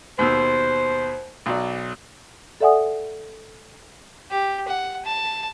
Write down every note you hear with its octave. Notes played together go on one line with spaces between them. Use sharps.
D#2 B2 C5 E6
B1 F#3 D5
A4 D5 E5 F#5 G#5 D#6
G4
F#5
A5